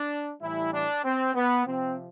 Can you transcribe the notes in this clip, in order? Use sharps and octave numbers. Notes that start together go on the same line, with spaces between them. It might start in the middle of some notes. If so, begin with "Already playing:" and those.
Already playing: D4
A2 E3 G3 E4
D4
C4
B3
C3 F3 C4